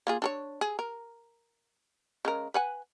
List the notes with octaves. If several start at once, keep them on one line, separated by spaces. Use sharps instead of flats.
A#3 F4 G#4
D4 A4 C#5
G#4
A#4
C#3 G#3 A#4
B4 F#5 G#5